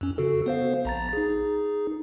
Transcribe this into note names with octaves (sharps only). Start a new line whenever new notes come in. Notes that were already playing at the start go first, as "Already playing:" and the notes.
F2 C#4
C#3 F#4 A4
B3 C5 F5
A#1 A#5 A6
D#4 G#4